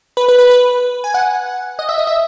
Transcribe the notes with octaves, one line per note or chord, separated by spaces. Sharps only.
B4
B4
B4
B4
G#5
F#5
D#5
E5
D#5
E5